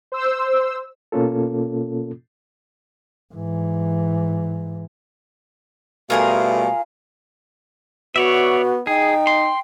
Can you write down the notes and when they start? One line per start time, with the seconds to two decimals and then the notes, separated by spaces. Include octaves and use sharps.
0.12 C5 E6
1.12 B2 A#3 C#4 F4 A4
3.34 G#2 E3
6.10 B2 G3 A3 F4 G#4 A#4 F5
8.16 B3 F#4 C#5 D5 E5
8.87 D#4 G#4 G5
9.27 C6